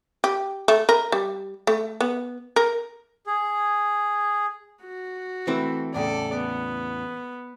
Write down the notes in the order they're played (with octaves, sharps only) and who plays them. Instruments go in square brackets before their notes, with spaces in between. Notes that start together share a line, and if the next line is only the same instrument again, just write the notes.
[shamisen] G4
A3
A#4
G3
A3
B3
A#4
[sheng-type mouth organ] G#4
[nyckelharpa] F#4
[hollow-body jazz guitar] E3 A3 C4
[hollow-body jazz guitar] E2 A2 C#3 [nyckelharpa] A4 D5
[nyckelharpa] B3